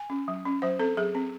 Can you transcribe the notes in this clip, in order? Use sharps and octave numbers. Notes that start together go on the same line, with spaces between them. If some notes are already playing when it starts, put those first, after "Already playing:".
Already playing: G#5
C#4
F#3
C#4
F#3 C5
C4 A4
F#3 G#4
C4